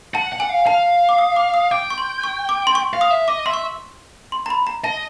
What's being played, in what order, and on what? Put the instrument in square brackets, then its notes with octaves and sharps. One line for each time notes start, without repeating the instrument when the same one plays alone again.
[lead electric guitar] F#5 [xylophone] A5
[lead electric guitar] F#5
[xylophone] G#5
[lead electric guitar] F5
[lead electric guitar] F5 [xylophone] A5
[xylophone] D6
D#6
D6
D#6
[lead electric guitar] G5 [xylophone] D6
[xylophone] C#6
C6
C#6
D6
C6
C#6
[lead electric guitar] F5
[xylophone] D#6
[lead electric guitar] E5
[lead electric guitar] D#5 [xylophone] D6
[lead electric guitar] E5 [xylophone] C6
[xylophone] C#6
C6
A#5
B5
A#5
[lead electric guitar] D#5 [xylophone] A5